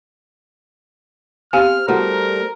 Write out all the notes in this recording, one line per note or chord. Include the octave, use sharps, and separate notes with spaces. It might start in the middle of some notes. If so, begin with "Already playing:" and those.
C4 G4 F5 G#5 F6
G3 A3 E4 F#4 A#4 C5 F#5